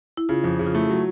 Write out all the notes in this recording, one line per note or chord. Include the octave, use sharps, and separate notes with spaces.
E4
C#3 F4
F2
C#3
F4
A3 E4
F#3